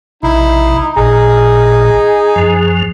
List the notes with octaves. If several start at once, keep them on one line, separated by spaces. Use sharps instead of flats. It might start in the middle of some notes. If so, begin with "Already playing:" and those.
A#1 C3 D#4 E4
A1 A#2 D#4 G#4
F#2 F3